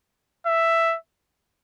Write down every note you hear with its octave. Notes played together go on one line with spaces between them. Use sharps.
E5